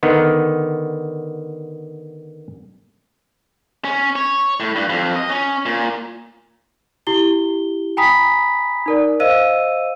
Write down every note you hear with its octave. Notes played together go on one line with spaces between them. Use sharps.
D3 D#3 B3
C#4
C#5
A2
G2
F2
D#5
C#4
A#2
E4 G4 G7
G5 G#5 A#5 B5 D#6 B6
D#4 A#4 D5
C5 D#5 F5 E6 D#7